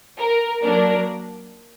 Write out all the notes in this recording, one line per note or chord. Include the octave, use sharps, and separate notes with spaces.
A#4
F#3 A#3 D4 A#4